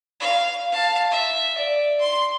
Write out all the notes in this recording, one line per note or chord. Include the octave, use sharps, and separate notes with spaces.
F5
F5 A5
E5
D5
C6